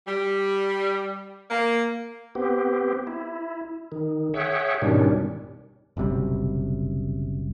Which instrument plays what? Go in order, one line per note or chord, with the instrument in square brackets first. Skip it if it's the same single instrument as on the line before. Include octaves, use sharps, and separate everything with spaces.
[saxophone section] G3
A#3
[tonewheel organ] B3 C4 G4
E4
D#3
G#4 C#5 E5 F#5 G5
G#2 B2 D#3 G3 C#4 D4
[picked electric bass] F#1 B1 C3 G3